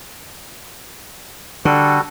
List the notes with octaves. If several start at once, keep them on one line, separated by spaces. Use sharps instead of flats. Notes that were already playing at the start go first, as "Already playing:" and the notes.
D3 G3 F#4 A4